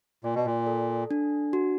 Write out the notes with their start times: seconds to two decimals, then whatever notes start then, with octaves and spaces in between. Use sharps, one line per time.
0.24 A#2 D5
0.35 B2
0.45 A#2
0.67 A4
1.11 D4
1.53 F#4